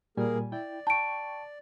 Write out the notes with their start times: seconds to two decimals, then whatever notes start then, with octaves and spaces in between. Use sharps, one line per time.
0.17 A#2 G3 A#3 G#4 A#4 G#5
0.52 E4 D5 G5
0.87 G5 A5 C#6 D7